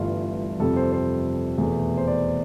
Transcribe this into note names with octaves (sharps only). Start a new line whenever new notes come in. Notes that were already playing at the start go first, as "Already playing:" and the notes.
Already playing: G1 G2 E3 A3 F4
F2 C3 G3 A4
C5
C5
E2 B2 A3
C5
D5